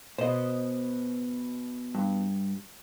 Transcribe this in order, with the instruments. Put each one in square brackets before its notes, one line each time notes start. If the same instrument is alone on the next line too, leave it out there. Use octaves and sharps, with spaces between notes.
[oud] B2 [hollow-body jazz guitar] C5 D#5
[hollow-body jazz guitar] G2